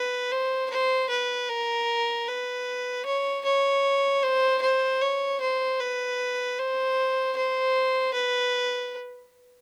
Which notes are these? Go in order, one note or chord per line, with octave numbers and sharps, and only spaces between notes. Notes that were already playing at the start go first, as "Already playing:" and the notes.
Already playing: B4
C5
C5
B4
A#4
B4
C#5
C#5
C5
C5
C#5
C5
B4
C5
C5
B4